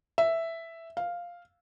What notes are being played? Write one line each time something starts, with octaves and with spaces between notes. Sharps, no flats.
E5
F5